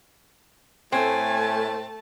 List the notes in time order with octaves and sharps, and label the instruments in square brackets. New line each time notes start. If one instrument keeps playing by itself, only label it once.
[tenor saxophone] A2 [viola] A3 A5 [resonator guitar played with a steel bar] C4 [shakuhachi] G#5